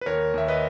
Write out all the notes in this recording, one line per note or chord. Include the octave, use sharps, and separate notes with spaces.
B4
D#2 A#4 C#5
D#2 E5
B4 D#5